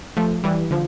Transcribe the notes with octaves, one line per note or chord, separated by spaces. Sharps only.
F3 A3
E3 G3
D3 F3